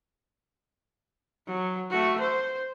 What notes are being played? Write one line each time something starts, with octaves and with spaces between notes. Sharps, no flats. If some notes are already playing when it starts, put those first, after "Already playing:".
F#3
A3 F#4
C5